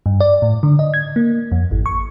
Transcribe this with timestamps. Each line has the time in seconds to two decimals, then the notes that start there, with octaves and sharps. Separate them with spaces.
0.06 G2
0.20 D5
0.42 A2
0.63 D3
0.79 D#5
0.94 G#6
1.16 A#3
1.52 F2
1.71 G#1
1.86 C#6